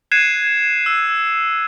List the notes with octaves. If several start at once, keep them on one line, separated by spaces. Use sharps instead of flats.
F#6 G#6 C7 C#7 D#7 E7
E6